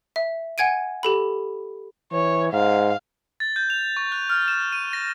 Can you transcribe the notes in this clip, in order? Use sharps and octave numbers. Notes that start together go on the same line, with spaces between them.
E5
F#5 G#5 G#6 D7 D#7
G4 A4 B5
E3 C#5
G#2 F5
A6
G6
F7
C#6
F#6
F6
E7
D#7
A#6